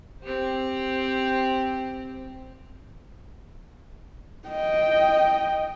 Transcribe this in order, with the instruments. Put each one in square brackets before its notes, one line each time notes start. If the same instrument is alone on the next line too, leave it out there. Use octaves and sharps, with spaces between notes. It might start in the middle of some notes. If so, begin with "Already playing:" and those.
[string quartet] C4 G4 C5
[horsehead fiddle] D#5 G5